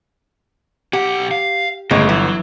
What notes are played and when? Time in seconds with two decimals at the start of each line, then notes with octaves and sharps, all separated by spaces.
0.93 B1 G4 F#5
1.31 F5
1.91 G1 A2 C#3 G#3
2.09 E3 F#3